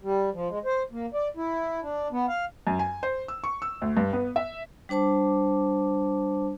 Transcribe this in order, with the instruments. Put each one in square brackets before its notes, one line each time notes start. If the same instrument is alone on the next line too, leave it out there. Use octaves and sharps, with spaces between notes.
[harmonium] G3
F3
G#3
C5
A#3
D5
E4
D4
B3
F5
[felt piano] F#2
G#5
C5
E6
C#6
E6
D2
G2
B3
E5
[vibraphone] G3 D4 C5 A5 D6